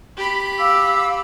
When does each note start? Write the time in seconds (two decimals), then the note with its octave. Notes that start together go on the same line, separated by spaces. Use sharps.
0.17 G4 B5
0.59 F5 D6 E6